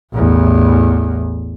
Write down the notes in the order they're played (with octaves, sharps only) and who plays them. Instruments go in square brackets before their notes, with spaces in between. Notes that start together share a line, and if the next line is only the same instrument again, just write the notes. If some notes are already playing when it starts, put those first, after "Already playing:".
[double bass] A1 E2